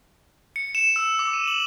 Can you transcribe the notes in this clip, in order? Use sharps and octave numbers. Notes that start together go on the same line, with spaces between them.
C#7
E7
E6
D6
D#7
F#7